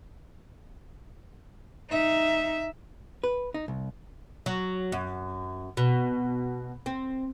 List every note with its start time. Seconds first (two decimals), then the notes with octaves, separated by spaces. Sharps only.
1.90 D#4 E5
3.24 B4
3.54 D#4
3.68 C2
4.46 F#3
4.92 F#2
5.77 B2
6.86 C4